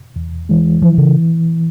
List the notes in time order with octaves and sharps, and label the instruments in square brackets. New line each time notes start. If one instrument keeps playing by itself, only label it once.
[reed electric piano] E2
E3 G#3
[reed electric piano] E3 [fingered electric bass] F3
[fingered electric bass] C#3